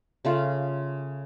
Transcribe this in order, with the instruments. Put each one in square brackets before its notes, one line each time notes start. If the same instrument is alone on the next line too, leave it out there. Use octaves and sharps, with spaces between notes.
[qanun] C#3 A3 F4